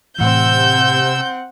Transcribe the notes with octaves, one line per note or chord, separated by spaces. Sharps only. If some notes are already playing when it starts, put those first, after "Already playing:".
A2 C3 E3 C4 F#5 E6 G6